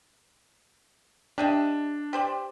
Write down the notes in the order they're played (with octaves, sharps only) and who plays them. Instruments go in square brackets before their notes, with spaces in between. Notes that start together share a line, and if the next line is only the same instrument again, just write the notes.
[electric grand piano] D4 [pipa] G4 D#5 E5
[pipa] G4 C5 D5